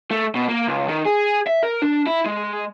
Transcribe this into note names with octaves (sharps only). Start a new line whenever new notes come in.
A3
B2
A#3
C#2
D#3
G#4
E5
A#4
D4
E4
G#3